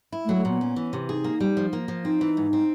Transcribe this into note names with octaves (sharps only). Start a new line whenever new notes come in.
E4
A3
F#3
A3
A#2 B3
C#4
E3
C3
D#4 G#4
A#3
G3
F3
A#3
F3
C4 D#4
E3
G#2
C4